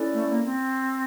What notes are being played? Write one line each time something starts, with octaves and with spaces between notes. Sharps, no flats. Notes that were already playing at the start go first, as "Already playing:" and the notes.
Already playing: C#4 E4 A4 D5
A3
A#3
C4